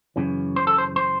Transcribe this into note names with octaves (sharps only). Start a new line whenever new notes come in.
F#2 C#3 E3
C5
A4
C5
C5